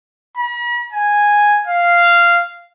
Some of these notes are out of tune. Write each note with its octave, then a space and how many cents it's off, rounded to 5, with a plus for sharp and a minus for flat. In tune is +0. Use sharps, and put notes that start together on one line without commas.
B5 -45
G#5 -5
F5 -10